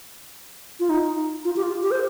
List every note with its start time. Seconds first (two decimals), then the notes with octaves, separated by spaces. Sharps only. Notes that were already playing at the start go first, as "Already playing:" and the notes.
0.80 F4
0.90 D#4
1.45 F4
1.56 G4
1.63 F4
1.82 G4
1.91 C5